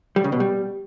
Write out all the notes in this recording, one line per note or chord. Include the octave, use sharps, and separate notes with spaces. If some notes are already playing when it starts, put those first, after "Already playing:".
G3
C#3
B2
G3